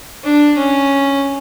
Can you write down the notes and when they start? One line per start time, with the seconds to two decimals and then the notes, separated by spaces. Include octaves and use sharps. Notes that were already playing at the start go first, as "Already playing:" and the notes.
0.24 D4
0.57 C#4